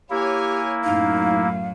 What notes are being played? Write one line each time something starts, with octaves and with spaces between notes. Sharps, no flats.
A#3 E4 G4 C#5 G#5
F#2 A2 F#3 D#4 F5